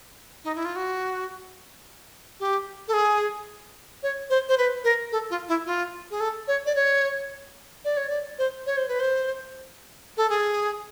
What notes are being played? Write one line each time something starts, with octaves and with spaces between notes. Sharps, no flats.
D#4
E4
F4
F#4
G4
A4
G#4
C#5
C5
C5
B4
A#4
A4
F4
E4
F4
G#4
A4
C#5
D5
C#5
D5
C#5
D5
C5
C#5
C5
B4
C5
A4
G#4